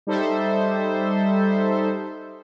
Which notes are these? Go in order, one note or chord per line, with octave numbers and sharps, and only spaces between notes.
G3 D#4 A4 C5 E5